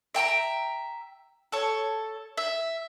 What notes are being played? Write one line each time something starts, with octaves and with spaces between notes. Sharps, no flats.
E5 G5 A5 A#5
A4 C#5
E5